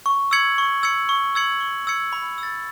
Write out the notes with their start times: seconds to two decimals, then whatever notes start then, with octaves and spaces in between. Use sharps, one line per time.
0.06 C#6
0.31 E6 G#6 C#7 F#7
0.58 C#6
0.83 E6 G#6 C#7 F#7
1.09 C#6
1.35 E6 G#6 C#7 F#7
1.61 C#6
1.87 E6 G#6 C#7 F#7
2.13 B5
2.38 E6 A6